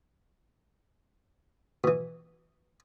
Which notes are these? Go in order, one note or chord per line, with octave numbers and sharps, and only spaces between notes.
B2 E3